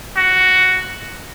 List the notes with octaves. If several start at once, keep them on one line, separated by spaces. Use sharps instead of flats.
F#4